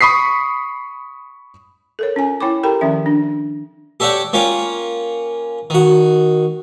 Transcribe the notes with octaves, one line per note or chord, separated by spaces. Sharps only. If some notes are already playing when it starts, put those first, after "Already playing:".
B5 C#6 D#6 B6 C7
A4 A#4 C#5
C#4 F4 G#5
E4 C#5 G5 B5 C#6 D6
G4 A4 A#4 G5 A#5 B5
D#3 F3 C#4 E5
D4
G4 A4 C#5 D5 F#5 G5
A#3 C#4 F4 C#5 G5
D#3 F#4